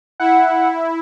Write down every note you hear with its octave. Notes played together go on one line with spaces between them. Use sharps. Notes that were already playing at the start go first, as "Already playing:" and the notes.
E4 F#5